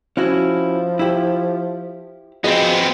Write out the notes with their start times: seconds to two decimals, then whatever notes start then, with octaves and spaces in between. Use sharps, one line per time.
0.17 F3 C#4 E4 F#4
0.99 E4 G4
2.44 F3 B3 C4 F#4 G#4 D#5